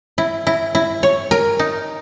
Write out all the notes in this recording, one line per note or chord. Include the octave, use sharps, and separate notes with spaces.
E4
E4
E4
C#5
A#4
D#4